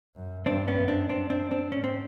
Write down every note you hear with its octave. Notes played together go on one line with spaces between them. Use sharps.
F#2
G2 C4 D4
B3 C#4
F#2
C4 D4
F#2 C4 D4
C4 D4
C4 D4
G#2 C#4
C4